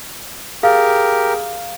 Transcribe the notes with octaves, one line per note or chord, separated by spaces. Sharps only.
G4 G#4 A#4 F5